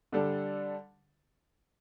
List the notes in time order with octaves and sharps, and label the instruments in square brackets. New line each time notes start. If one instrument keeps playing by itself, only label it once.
[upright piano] D3 G3 D4 A4